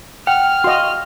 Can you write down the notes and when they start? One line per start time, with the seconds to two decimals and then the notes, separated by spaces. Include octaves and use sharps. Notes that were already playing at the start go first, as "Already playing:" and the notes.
0.27 F#5 G5 F6
0.64 F#4 D#5 F5 C6